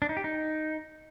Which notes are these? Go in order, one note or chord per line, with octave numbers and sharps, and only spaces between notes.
D4
D#4
G4
D#4